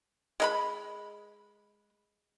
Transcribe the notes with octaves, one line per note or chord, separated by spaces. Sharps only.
G#3 A#4 B5